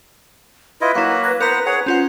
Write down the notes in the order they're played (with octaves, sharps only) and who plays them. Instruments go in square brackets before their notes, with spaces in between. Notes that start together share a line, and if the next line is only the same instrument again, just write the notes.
[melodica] E4 F4 D#5 [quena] B4
[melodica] F#3 A#3 F#4 [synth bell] E4 F#5
[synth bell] F#6 G#6 A#6
[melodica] B3 C5 F#5 [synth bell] A#4 A#5 F7
[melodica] G#4 C#5 F#5
[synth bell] C#4 F4 F#5 [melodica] C5